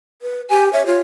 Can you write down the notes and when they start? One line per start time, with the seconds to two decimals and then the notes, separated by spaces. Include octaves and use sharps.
0.22 B4
0.50 G4 G#5
0.73 C#5 E5
0.86 F4 C#5